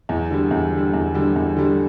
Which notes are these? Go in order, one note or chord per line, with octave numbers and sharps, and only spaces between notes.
E2
D3 G3
E2
D3
G3
E2
D3 G3
E2
D3 G3